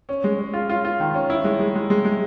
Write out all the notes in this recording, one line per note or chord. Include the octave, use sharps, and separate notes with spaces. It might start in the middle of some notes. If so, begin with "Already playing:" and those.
C#4
G#3
C#4
F4
F4
F4
D#3
C#4
E4
G#3
G#3
G#3
G#3
G#3